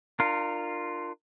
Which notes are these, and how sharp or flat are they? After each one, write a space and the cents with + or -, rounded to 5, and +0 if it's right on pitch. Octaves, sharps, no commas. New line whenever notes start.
D4 +35 F4 +0 A#4 -10